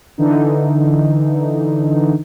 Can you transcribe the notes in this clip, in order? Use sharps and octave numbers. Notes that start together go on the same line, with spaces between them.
D3 E3 D#4